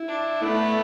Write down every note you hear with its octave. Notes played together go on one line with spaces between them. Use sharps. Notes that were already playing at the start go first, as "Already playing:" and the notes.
Already playing: E4
D4
A3 B3